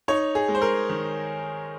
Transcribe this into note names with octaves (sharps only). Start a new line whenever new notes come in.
D#4 C#5
G#4
G#3
C5
A#4
D#3